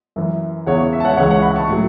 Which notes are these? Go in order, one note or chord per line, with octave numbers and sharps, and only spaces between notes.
F#2 E3
E2 C#3 E3 C#5 F#5
C#5
E5
A5
C#5 F#5
C#2 C#3 E3 C#5 F#5
C#5 F#5
F#5 B5
A5 C#6
A2 F#3